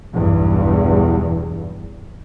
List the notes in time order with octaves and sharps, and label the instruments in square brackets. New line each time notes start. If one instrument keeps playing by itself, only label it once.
[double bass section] B1 E2 G2